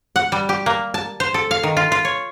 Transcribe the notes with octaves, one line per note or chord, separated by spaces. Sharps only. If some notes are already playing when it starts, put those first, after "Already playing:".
F#5
G3
G4
A#3
A5
C5
A4
F5
D#3
F4
F4
C#5